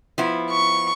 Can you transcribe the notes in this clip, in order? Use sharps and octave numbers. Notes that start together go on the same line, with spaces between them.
F3 B3 E4
C#6